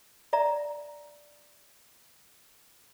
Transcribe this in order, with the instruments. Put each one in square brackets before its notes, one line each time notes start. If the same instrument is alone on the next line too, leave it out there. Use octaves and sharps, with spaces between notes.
[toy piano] D5 E5 A#5